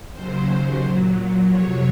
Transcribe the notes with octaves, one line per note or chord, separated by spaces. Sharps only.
D#2 C#3 F#3 C5
A#2 F#3
F2 C3 F#3 C#5